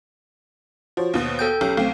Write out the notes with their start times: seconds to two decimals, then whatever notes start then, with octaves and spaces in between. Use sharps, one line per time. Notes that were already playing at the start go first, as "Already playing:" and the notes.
0.97 F3 F#4 C5 C#5
1.14 D#2 B2
1.39 A4 G5 G6
1.61 B1 C#4 G4 C#5
1.77 B1 A3 C4 F5 G5